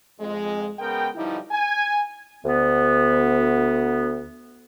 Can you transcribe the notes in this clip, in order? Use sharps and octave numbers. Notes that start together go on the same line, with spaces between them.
F2 G#3
C#3 G#3 B3 A#4 G5
B2 D3 F3 G3 D#4 E4
G#5
D2 B3